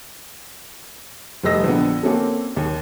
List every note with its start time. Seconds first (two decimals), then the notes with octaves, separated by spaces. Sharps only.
1.44 F1 G3 A3 D#5 E6 A#6
1.64 A#1 D3 B3
2.03 A#3 C4 C#4 F#4 A4
2.56 D#2